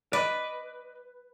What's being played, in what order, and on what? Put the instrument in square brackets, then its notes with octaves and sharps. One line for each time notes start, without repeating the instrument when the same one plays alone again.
[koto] B4 [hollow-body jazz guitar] D5 D#5